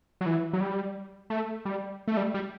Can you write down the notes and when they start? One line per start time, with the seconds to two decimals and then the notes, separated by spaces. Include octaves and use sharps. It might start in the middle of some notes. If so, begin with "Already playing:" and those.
0.21 F#3
0.26 E3
0.53 F#3
0.61 G3
1.30 A3
1.65 G3
2.08 A3
2.17 G3
2.34 G3